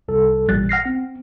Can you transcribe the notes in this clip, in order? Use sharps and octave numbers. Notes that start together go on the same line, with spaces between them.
C2 A4
A1 A#2 G3 F#6 A6
F#5 F6 A#6 C7
C4